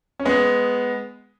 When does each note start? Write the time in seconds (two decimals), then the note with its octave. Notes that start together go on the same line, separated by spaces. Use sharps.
0.19 C#4
0.25 G#3 B3